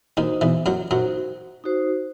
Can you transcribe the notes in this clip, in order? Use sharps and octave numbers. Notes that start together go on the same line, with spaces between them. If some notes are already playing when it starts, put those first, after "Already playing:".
D#2 D#3 D#4 F#4 C5
E2 E3
F#2 F#3
F#2 F#3 D#4 F#4 C5
D#4 F#4 C5